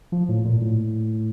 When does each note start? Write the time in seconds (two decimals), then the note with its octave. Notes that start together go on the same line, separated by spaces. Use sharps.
0.12 F3
0.29 A2
0.45 A#2
0.61 A2